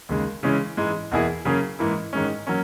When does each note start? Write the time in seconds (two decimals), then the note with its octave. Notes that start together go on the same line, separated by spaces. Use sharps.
0.09 D#2 C#3 G#3
0.43 C#3 E3 G#3 C#4
0.77 G#2 E3 G#3
1.11 E2 B2 A#3 E4 G#4
1.45 C#3 F#3 A#3 C#4 G#4
1.79 G#2 E3 A#3 E4
2.13 G#2 D#3 G#3 C#4
2.47 F#3 A#3 C#4